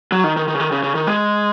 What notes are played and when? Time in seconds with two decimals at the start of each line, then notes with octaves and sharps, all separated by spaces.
0.12 F#3
0.24 D#3
0.37 D#3
0.48 D#3
0.55 C#3
0.60 D#3
0.72 C#3
0.83 C#3
0.95 D#3
1.07 G#3